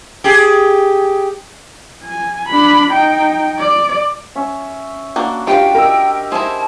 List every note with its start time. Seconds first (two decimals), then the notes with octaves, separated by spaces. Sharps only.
0.24 G4 G#4
2.03 G#5
2.48 D4 B5
2.91 D#4 G5
3.59 D5
4.35 C#4 E5
5.16 A#3 D4 F#4
5.47 D4 F4 G4 A#4 F5 G5
5.74 G4 A#4 D#5 E6
6.32 E4 G#4 C5 A5